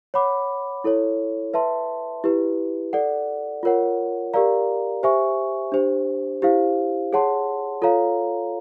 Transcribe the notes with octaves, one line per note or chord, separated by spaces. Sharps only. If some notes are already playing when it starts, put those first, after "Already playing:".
C#5 F#5 B5 D6
E4 A4 C#5
B4 E5 A5 C6
E4 G4 B4
A4 D5 F#5
F4 A#4 C#5 F#5
G4 A#4 D5 F5 A#5
G4 C5 E5 G#5 C#6
D4 G4 C5
E4 G4 C5 F5
G#4 C#5 F#5 A5 C6
F4 A4 C#5 F5 A#5